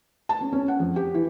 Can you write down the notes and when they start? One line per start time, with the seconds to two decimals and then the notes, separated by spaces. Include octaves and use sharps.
0.29 A5
0.41 C#4
0.53 C#4
0.68 F#5
0.80 F2
0.96 G4
1.14 E3